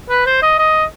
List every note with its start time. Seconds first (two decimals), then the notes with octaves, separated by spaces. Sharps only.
0.09 B4
0.26 C5
0.42 D#5
0.59 D#5